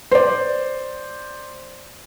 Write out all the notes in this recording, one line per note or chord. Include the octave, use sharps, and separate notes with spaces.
C5 D5